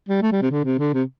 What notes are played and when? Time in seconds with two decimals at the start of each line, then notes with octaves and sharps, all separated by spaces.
0.09 G3
0.22 A3
0.32 G3
0.42 C3
0.51 D3
0.65 C3
0.79 D3
0.94 C3